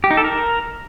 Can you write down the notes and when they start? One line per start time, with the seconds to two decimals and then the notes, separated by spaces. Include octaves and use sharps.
0.04 G4
0.11 D#4
0.17 A4
0.24 A#4